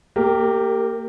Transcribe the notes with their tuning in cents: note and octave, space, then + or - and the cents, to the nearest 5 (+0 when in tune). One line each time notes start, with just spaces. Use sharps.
A#3 -30 G4 +0 A#4 +0